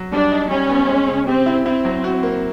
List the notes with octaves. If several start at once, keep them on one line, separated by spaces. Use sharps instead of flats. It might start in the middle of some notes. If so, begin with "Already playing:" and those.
Already playing: F#3
G3 D4
D#4
G3 C#4
B3
G#3
C#3
C4 G4
E4
C4 E4
F#3
F#4
A#3